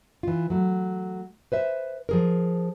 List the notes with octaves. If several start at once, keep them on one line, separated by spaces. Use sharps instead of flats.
E3 F4
F#3 A3
B4 C5 E5
F3 G#4 A#4